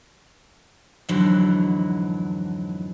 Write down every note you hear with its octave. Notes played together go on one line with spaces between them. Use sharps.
F2 G#2 D3 E3 F#3